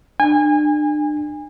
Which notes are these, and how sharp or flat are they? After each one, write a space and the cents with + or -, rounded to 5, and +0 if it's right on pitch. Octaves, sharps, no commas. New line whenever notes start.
D4 +35 G#5 -30